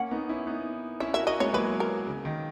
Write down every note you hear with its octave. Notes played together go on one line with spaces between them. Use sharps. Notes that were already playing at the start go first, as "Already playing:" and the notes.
Already playing: A#3 C#4 F#5
B3 D#4
C#4 E4
B3 D#4
C#4 E4 E5
F#4 A#4 E5
F#4 A#4 D#5
G#3 B3 C#5
F#3 A#3 B4
A#4
C#3
D#3